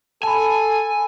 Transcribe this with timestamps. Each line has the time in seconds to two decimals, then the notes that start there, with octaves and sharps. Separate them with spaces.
0.23 A4 G#5 A5 B5